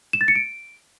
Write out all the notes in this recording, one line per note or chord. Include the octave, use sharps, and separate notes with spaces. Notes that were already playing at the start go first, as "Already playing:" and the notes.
E7
A6
C#7
D7